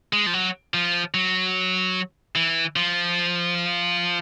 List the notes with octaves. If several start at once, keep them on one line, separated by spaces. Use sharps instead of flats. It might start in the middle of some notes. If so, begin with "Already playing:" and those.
G#3
F3
F#3
F3
F#3
E3
F3